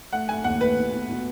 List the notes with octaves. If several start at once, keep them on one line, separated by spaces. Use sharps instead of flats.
A3 F#5
A3 G#5
D#2 F#5
A3 B4
B2
B2
B2